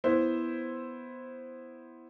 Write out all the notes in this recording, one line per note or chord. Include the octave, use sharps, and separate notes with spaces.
B3 E4 C5